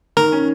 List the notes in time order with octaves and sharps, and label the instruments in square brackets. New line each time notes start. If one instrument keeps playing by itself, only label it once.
[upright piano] D#3 [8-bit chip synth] A#4
[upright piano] C#4